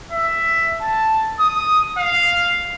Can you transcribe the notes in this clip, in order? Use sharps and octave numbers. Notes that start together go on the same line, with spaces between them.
E5
A5
D#6
F5